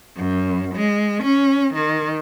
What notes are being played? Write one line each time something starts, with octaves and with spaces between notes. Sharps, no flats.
F#2
G#3
C#4
D#3